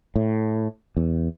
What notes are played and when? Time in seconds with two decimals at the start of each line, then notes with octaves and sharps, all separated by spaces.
0.16 A2
0.97 E2